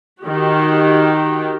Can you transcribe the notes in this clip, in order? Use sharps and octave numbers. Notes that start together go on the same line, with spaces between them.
D#3 F#4 G4